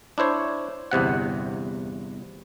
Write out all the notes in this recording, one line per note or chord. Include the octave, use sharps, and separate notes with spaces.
D4 E4 C5 C#5
G1 E2 C3 F#5